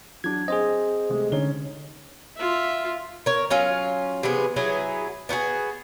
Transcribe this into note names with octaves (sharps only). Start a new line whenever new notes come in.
F#3 D4 G#6
C4 G#4 C5 D#5
C3 G#3 A3
D3 C#4 D#4 C#5 G7
F4 E5
A#4 C#5
F#3 C#4 F4
C3 E3 B3 G#4
F#3 B3 E4 G#4
B3 D4 F#4 G#4